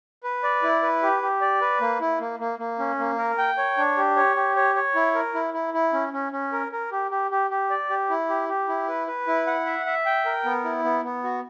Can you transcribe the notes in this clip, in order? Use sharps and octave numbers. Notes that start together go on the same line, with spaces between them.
B4
D5
E4
B4
G4
G4
D5
B4
A#3
E4
A#3
A#3
A#3
C#4
A#3
A#4
G5
C#5
D4
G4
C#5
G4
C#5
C#5
E4
A#4
E4
E4
E4
C#4
C#4
C#4
A#4
A#4
G4
G4
G4
G4
D5
G4
E4
G4
G4
E4
B4
B4
E4
F#5
E5
E5
G5
A#4
B3
E4
B3
B3
F#4